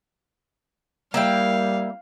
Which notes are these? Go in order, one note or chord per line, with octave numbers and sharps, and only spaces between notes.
G3 A#3 E4 F5 G5